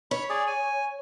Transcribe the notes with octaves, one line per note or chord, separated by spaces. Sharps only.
C#5 B5
G#4 D5
G#5